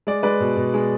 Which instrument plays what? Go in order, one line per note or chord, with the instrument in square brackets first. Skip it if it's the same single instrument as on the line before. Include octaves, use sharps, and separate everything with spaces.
[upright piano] G#3 D5
G#3 B4 D5
B2
B2
G#3